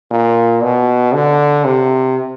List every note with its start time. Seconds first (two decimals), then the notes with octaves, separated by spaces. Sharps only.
0.11 A#2
0.63 B2
1.14 D3
1.65 C3